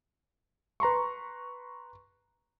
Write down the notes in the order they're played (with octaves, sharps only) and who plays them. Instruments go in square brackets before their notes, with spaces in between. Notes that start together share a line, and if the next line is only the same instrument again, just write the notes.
[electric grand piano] B4 A#5 C6 C#6